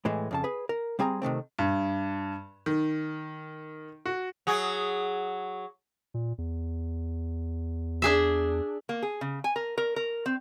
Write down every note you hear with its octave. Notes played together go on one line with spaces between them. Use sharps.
A2 E3 G#3
F2 C#3 A5
G#4 B4
A#4
G3 C4 G#4 G#5 A#5
C3 D#3 A3 C4
G2
D#3
F#4
F#3 G#4
A#2
E2
D4 G#4 E5
A#3
G#4
C#3
G#5
A#4
A#4
A#4
C4